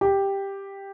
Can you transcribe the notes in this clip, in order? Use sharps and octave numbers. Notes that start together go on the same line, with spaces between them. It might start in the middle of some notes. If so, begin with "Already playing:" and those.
G4